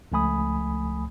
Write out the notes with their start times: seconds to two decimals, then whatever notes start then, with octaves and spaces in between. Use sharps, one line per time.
0.12 C#2 F3 A3 G#5 B5 D#6